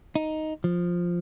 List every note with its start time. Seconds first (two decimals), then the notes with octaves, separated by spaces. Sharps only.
0.15 D#4
0.64 F3